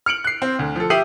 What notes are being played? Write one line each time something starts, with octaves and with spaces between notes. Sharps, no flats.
F6 C#7 D7 F#7
F#6 C7
C4
D2
F3 A4
G4 E5 D#6 C7 D#7 F#7